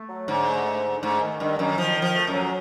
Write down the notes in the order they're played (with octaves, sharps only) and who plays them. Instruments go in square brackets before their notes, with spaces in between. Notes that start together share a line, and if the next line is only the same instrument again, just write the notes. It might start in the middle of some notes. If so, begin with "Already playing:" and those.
Already playing: [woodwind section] A3
F#3
[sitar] G#2 [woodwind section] D3
[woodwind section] A3
D3
D3
[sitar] G#2 [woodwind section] A3
[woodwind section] D#3
[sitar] G2 [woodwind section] D#3
[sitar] F#2 [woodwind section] D#3
[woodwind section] D#3 [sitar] F3
[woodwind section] D#3
[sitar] F3
[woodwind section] A3
[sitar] F#2
[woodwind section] F#3